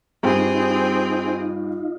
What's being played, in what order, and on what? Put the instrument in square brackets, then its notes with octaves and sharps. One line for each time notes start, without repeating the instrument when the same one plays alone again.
[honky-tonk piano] G2 G4 [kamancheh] C4 G#4 [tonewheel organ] D#4 F4